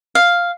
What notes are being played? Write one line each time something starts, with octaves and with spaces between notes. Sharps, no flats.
F5